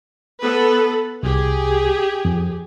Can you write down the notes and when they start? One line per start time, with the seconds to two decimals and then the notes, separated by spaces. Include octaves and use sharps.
0.42 B3 A4 B4
1.23 C2 G4 G#4
2.25 F2